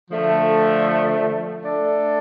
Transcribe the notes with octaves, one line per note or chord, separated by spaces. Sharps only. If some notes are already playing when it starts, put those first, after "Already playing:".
D3 F3 A3
A3 D4 A4 D5